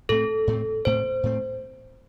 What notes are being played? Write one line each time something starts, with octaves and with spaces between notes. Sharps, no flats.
A2 A3 C4 A4
A2 A3 C4
A2 A3 C4 C5
A2 A3 C4